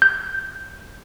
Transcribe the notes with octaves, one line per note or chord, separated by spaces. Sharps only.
G6